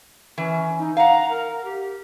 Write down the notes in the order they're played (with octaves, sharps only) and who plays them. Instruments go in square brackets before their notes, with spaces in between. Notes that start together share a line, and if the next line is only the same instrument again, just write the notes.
[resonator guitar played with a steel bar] E3 [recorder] C#4
[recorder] D#4
[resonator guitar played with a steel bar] F5 F#5 [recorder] A#5
[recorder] A#4
G4